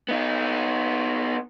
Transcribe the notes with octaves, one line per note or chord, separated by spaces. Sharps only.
B3 D#4